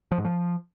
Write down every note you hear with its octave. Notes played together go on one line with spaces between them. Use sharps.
F3
G#2
F3